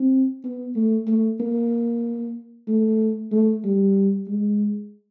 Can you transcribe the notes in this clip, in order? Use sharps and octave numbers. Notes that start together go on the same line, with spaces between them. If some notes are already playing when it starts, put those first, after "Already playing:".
Already playing: C4
B3
A3
A3
A#3
A3
A3
G3
G#3